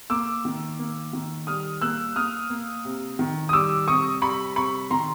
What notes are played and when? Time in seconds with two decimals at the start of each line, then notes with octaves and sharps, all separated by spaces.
0.10 A#3 D6 E6
0.45 D#3
0.79 A#3
1.13 D#3
1.47 G3 D#6 F6
1.81 A#3 E6 F#6
2.16 A#3 D#6 F6
2.50 A#3
2.85 C3
3.19 D#3
3.49 D#6
3.53 G3 D6 E6
3.88 C3 C#6 D#6
4.22 G3 B5 C#6
4.56 C3 B5 C#6
4.91 D#3 A#5 C6